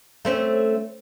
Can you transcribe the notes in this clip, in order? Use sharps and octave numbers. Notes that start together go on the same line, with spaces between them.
A3 C4 C#4